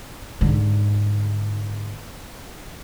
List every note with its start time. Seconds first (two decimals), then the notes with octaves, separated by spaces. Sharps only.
0.41 G#2 D3